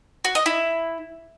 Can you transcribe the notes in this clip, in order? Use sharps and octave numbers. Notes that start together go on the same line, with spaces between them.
F#4
D#5
E4